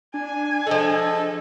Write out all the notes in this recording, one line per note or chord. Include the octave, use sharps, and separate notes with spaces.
D4 G#5
F3 G#3 A4